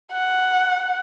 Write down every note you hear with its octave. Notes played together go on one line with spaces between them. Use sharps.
F#5